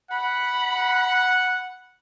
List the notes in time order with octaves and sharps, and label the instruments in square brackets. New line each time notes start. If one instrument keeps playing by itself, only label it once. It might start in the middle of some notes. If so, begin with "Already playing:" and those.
[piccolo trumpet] F#5 [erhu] B5